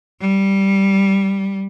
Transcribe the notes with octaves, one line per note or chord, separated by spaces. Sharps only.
G3